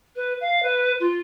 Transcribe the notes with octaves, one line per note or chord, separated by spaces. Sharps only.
B4
F5
B4
F4